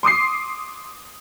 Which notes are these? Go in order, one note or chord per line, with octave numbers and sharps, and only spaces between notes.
C6 D6 D#6 C7